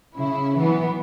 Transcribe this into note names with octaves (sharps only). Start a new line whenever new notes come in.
C#3 E4
E3 F#3 B3